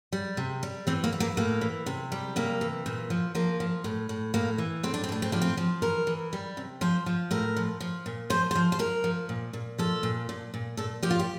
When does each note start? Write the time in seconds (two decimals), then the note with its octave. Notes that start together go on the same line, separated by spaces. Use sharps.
0.12 G3
0.37 C3
0.63 G3
0.87 E3 C4
1.04 A#3
1.12 E3
1.20 A#3
1.37 A2 A#3
1.61 E3
1.86 C3
2.12 G3
2.36 C3 A#3
2.61 E3
2.86 A#2
3.10 F3
3.35 F3 A#3
3.60 F3
3.84 A2
4.09 A2
4.34 A2 A#3
4.58 E3
4.83 A2 C4
4.94 D4
5.04 C4
5.09 A2 D4
5.22 C4
5.32 F3 D4
5.42 C4
5.57 F3
5.82 E3 A#4
6.07 E3
6.33 G3
6.57 C3
6.81 F3 C5
7.06 F3
7.31 A2 A#4
7.56 F3
7.80 F3
8.06 A#2
8.30 F3 C5
8.51 C5
8.55 F3
8.72 C5
8.79 F3 A#4
9.04 F3
9.29 A#2
9.53 A#2
9.78 F3 A4
10.03 A#2
10.29 A#2
10.54 A#2
10.77 A#2 A4
11.03 F3 G4
11.11 F4
11.19 G4